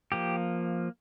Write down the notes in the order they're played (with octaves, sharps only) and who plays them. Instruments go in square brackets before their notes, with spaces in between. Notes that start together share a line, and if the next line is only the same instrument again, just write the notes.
[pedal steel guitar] F3 A#3 G4